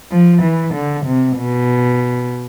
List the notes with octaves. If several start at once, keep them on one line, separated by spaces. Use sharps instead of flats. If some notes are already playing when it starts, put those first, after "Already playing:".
F3
E3
D3
C3
B2